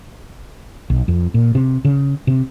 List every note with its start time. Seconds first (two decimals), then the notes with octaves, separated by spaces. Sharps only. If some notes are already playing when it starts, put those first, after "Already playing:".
0.90 B1
1.08 F2
1.34 A#2
1.55 C3
1.85 C#3
2.27 C3